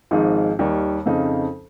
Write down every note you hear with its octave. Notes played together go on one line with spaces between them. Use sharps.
G#1 G#2 F3 G#3 D#4
D#2 D#3 G3
F2 C#3 F3 C4 D#4